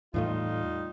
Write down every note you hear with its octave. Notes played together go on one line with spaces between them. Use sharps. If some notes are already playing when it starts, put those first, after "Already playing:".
E2 A2 G3 A3 D#4 F4